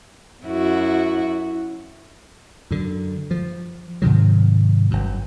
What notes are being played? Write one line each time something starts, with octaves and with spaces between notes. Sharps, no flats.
F#2 E4 F#4
F#2 D3
F3
G#2 C3 D#3 F#3
G1 F#2